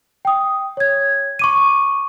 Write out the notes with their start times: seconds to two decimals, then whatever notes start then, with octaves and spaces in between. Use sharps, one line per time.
0.25 G5 D#6
0.77 C#5 G#6
1.39 C#6 D6 D#7